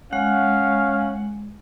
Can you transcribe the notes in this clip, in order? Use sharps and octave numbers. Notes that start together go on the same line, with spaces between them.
G#3 C#4 F5 F#5